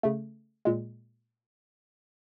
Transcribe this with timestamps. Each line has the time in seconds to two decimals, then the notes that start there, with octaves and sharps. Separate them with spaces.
0.03 C#3 A3
0.65 A#2 G#3